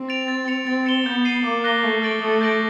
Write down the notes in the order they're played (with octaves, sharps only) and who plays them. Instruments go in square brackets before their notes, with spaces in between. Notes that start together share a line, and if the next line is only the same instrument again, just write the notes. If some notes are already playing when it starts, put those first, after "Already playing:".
Already playing: [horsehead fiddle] C4
[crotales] A6 D7 F7
A6
C#7 F7
[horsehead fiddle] C4 [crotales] A6
[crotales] C#7 E7 G7
[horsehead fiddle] B3 [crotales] G6
[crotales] C7 D#7 F#7
[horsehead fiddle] A#3 [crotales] D6
[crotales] F#6 A#6 D#7 G7
[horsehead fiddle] A3 [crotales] C#6
[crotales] F6 A6 D7 F#7
[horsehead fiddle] A3 [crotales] D#6
[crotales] G6 A#6 D7 F#7